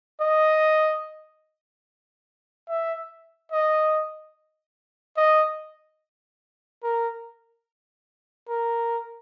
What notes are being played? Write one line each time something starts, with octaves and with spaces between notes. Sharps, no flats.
D#5
E5
D#5
D#5
A#4
A#4